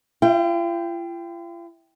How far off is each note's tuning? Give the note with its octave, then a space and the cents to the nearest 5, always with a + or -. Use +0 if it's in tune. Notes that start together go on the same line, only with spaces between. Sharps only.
F4 -45 G5 +0